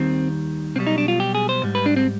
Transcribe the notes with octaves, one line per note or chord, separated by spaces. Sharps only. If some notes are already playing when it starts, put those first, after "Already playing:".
Already playing: D#2 D#3 G3 C4
B1 B2 G3 C4
D#4
D4
F4
G4
G#4
C5
G#2 G3
B4
D4
C4